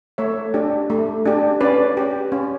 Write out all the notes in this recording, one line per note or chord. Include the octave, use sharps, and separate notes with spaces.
A3 C#5 E5
D4 G4
A3
D4 G4
C#4 B4 D5
G4
C#4